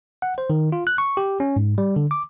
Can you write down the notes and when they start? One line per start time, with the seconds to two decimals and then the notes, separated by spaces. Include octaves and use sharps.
0.22 F#5
0.38 C5
0.50 D#3
0.72 F4
0.87 F#6
0.98 C#6
1.17 G4
1.40 C#4
1.56 G#2
1.78 G3
1.96 D3
2.11 D6